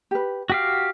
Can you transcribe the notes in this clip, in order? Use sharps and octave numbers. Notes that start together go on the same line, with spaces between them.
G4 B4
F#4 G4 F5 G5